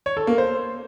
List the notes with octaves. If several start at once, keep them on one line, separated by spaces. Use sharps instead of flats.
C#5
A4
A#3
C5